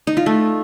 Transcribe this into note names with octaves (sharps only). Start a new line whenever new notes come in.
D#4
F4
A3